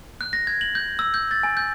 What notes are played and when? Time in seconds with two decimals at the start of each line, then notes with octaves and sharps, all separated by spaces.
0.21 F#6
0.33 A#6
0.47 G#6
0.61 F#7
0.75 G6
0.99 E6
1.14 G6
1.31 A6
1.43 G#5
1.57 G6